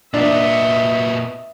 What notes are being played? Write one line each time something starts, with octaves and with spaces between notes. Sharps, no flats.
A#2 B3 D4 D#5 E5